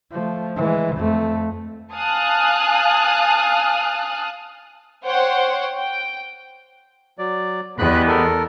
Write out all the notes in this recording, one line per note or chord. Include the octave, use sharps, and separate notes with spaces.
F3 A3
E3 G#3
F2 A3
F5 G#5 A5 D#6 F6 F#6
C5 C#5 F#5 G5
G5
F#3 D5
E2 G3 G#3 B3 B5 F#6
A4 A#4